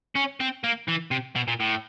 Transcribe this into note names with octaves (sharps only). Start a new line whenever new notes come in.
C#4
C4
A#3
E3
C3
B2
A#2
A2